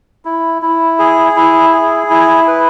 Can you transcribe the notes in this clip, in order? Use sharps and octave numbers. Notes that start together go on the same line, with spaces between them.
E4
E4
G#4
E4
G#4
E4
B4